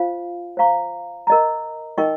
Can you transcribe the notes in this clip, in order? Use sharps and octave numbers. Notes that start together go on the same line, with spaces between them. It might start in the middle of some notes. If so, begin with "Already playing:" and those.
Already playing: F4 C5 F5 G#5
C5 F5 A#5 C#6
A#4 D#5 A#5
D#4 A#4 D#5 G5 C#6